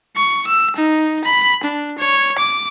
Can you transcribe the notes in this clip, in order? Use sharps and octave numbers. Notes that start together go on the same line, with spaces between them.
C#6
E6
D#4
B5
D4
C#5
D6